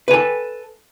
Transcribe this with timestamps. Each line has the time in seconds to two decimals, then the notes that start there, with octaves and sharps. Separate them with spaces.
0.08 B4
0.11 G#5
0.14 A4